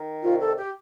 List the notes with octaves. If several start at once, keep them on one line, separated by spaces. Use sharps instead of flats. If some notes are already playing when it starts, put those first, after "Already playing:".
Already playing: D#3
C2 F4
A4
G4